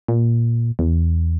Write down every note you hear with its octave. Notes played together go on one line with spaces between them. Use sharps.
A#2
E2